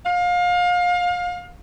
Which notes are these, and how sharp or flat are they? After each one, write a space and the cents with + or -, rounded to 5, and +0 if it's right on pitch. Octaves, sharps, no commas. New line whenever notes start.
F5 +30